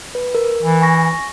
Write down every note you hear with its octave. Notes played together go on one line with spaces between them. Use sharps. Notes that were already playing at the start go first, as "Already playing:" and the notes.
B4
A#4
E3
G#5 C#6 A#6